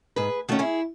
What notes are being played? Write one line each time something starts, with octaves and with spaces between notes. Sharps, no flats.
G#2 G#4 B4
D#3 A3 C#4 F#4
E4 G#4